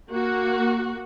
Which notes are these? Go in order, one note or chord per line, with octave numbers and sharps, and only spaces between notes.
A#3 F#4